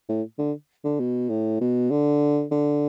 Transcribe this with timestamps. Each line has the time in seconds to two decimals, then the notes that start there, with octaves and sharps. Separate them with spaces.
0.09 A2
0.39 D3
0.84 D3
1.00 B2
1.30 A2
1.61 B2
1.91 D3
2.51 D3